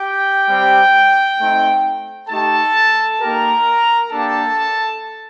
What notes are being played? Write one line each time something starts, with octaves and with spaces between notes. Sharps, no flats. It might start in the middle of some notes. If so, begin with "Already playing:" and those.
Already playing: G4 G5
G3 C4 G4
A3 C4 D#4
A3 D#4 G4 A4 A5
A#3 D#4 G4 A#4 A#5
A#3 D4 G4 A4 A5